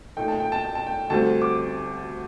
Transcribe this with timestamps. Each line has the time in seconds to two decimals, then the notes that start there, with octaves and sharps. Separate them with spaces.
0.17 A#2 A3 D#4 G5
0.28 A5
0.40 G5
0.52 A5
0.63 G5
0.75 A5
0.87 G5
1.10 D2 D3 G3 C4 A5
1.42 D6